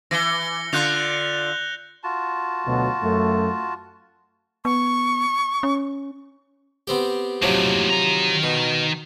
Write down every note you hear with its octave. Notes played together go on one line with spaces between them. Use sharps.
E3 A#6 C#7 G7
D3 F4 F#6 G6 F7
F4 F#4 A5
D2 B2 F#3
F#2 A3
B3 C#6
C#4
B3 C4 G4
D#2 A2 C3 F3 F#3
D#3 A#5
B2